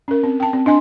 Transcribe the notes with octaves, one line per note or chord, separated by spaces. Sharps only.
C#4 A#4
C4
G5 A5
C4
D4 D#5 G#5 C6